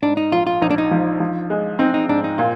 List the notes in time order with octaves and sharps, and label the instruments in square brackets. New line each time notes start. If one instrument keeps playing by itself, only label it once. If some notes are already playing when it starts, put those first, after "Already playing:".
[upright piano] G#2 [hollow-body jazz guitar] D4
[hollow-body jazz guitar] D#4
[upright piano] A#1 [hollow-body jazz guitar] F4
[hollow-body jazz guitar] F4
[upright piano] A#1 [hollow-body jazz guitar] D#4
[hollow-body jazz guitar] D4
D#4
[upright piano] F3
F3
G#3
[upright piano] C4 [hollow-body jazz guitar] D#4
[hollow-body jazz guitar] D#4
[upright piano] G#2 [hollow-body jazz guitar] D4
[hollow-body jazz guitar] D#4
[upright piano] A#2 [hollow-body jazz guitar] F4